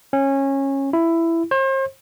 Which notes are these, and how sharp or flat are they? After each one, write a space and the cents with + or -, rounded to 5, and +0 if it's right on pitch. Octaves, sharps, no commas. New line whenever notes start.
C#4 -20
E4 +10
C5 +40